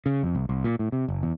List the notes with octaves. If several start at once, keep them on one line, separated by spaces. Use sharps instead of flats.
C#3
F2
C2
C2
A#2
A2
C3
F#1
E2